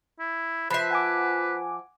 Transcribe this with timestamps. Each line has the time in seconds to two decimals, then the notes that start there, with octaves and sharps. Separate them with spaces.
0.19 E4
0.70 F3 B4 E5 B5 C7
0.91 F#5 G#5 D6